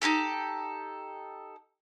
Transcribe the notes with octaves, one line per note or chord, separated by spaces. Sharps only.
D#4 E4 G4 A4